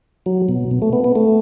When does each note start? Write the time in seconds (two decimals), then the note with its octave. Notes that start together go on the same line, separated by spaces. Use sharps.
0.26 F#3
0.49 B2
0.71 B2
0.82 A3
0.93 B3
1.04 B3
1.16 A3